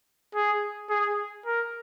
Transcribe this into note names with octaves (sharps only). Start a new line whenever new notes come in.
G#4
G#4
A#4